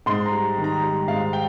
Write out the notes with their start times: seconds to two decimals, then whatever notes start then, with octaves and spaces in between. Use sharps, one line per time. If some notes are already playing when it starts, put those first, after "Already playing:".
0.06 G#2 C6
0.26 A#5
0.32 G3
0.58 D#3
0.64 A#5
0.83 G3
1.08 G#2 F5
1.33 G5